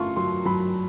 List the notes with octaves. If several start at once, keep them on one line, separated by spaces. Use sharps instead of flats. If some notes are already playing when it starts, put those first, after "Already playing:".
Already playing: A3 F4 C6 C#6
F#3 C6
F#3 B5